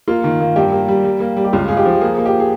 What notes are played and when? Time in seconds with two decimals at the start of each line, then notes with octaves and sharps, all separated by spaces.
0.08 A#3 F4
0.24 D#3
0.40 A#3
0.56 G2 G4
0.72 A#3
0.88 G3
1.04 G3
1.20 A#3
1.36 G3
1.44 G4
1.53 C#2 F4
1.68 C#2 G#4
1.77 G4
1.85 F3
2.01 A#3 G#4
2.18 A#3
2.26 G4
2.40 G#4